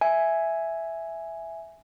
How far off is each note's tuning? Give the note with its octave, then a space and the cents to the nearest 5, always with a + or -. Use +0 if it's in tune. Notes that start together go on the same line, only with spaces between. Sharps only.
E5 +0 G#5 +0